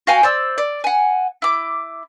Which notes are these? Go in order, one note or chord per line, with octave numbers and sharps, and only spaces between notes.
F#4 F5 G5 G#5
C5 D5 E6
D5
F#5 G#5
E4 D6